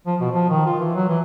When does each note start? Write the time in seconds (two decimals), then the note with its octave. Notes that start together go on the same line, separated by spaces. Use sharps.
0.06 F3
0.21 B2
0.32 F3
0.50 D#3
0.66 F4
0.79 E3
0.94 F#3
1.08 E3